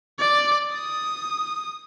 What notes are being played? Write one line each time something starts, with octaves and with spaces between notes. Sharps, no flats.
D5
D#6